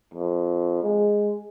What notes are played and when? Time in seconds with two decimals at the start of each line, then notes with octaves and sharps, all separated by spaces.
0.14 F2
0.83 G#3